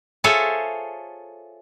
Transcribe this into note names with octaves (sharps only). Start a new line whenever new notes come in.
F4 G#4 A4 C5 C#5 E5